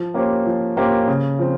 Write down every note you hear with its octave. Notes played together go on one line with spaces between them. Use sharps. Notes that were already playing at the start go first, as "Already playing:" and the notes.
Already playing: F3
A#3 C#4 G4 C5
F3
A#3 C#4 G4 C5
C#3
F3 C4